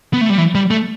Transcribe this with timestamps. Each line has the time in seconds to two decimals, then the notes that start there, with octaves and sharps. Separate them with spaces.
0.13 B3
0.21 A3
0.30 G3
0.38 E3
0.55 G3
0.71 A3